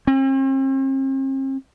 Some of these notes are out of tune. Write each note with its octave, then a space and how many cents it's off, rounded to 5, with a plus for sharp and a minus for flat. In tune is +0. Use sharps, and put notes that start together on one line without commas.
C4 +45